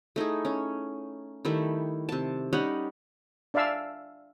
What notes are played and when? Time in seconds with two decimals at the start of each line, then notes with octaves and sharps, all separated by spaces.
0.16 A3 D#4 E4 G#4
0.45 C#4
1.45 D#3 G3 A3 E4
2.09 C3 A5
2.53 G3 C#4 D#4 F#5
3.54 D4 D5 E5 F5 G#5 E6